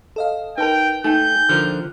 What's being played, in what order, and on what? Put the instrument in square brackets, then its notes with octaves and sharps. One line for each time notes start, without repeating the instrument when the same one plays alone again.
[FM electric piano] A4 D#5 F5
[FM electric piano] D#4 A#4 [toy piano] B4 A5 [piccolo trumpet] G5
[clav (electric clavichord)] A3 [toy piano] D#4 G5 [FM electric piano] G#5 [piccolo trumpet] G6
[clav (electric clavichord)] D3 F3 A#4 [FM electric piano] F6 F#6